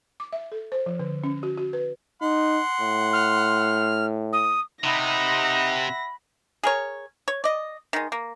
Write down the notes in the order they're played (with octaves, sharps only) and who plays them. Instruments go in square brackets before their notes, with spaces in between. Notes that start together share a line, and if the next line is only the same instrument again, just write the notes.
[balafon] D6
E5
A4
C5
F3
D3
C#4
F#4
F#4
B4
[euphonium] D#4 [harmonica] F#5 C6
[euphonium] A2
[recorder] F6
D#6
[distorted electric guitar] C3 [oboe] D#4 [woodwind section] E5 F#5 B5 [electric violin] A#6
[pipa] G#4 A#4 C#5
C#5
D5 D#5
D#3 G#3
A#3